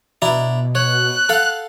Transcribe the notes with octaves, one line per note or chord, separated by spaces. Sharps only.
B2 D4 E4 A#5
C#5 F#6
A4 F5 F#5